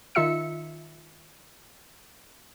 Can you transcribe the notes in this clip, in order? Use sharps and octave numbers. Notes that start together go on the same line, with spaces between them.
D#3 D#4 F4 E5 E6 C#7